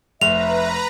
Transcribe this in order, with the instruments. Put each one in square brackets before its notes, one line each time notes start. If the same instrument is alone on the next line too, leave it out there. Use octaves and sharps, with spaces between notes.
[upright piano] F1 [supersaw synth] B4 A#5 [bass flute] E5 [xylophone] F7